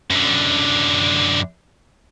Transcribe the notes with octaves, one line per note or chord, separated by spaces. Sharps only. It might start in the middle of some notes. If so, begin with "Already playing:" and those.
F#2 D3